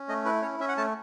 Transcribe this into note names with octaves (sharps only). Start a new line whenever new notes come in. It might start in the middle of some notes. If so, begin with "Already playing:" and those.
Already playing: C#4
A3 D#5
E4 B4
C#4 C#5
C#4 E5
F#5
A3 A5